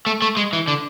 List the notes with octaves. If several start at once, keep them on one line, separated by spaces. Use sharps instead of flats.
A3
A3
G#3
E3
D3